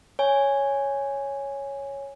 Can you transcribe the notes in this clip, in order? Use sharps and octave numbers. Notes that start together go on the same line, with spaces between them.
C#5 G#5